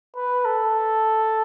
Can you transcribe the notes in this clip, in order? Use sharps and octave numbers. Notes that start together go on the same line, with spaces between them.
B4
A4